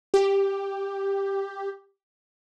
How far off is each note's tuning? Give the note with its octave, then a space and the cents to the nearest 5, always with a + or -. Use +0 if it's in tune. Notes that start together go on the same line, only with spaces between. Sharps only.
G4 +5